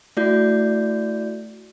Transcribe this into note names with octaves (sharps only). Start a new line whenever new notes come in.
A3 E4 F#4 D5 G6